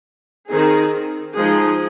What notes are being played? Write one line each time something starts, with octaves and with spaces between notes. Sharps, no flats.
D#3 C4 D#4 G#4
F3 G#3 D#4 G#4